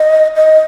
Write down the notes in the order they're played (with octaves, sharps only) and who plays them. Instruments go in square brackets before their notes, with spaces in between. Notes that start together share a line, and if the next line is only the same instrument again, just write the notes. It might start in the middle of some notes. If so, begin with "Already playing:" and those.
Already playing: [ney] D#5
D#5